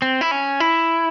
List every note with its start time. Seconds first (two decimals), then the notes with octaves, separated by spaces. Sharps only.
0.02 C4
0.21 E4
0.31 C#4
0.60 E4